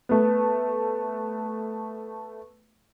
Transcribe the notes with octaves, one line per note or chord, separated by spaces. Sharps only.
A3 B3